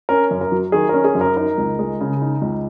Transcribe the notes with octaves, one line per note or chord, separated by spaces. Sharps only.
C#4 A#4
F#2
A#4
F#3
D#3 G#4
C#4 A#4
G#4
F#2
A#4
D#4 A#4
C#2
G#3
C#3
D#4
C#2